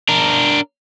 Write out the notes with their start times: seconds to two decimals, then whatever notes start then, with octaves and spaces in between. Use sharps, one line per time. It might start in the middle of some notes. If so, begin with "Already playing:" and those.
0.09 D4 A#4